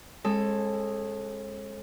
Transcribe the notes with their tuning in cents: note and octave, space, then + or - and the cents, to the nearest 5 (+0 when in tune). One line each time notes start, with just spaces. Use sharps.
G#3 -15 C#4 -45 A4 +0